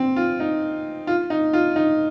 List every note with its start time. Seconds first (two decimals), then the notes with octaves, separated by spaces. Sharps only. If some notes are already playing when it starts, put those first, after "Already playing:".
Already playing: C4
0.16 F4
0.40 D#4
1.07 F4
1.30 D#4
1.53 F4
1.76 D#4